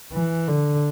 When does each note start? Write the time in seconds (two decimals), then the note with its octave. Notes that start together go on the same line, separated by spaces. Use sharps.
0.12 E3
0.47 D3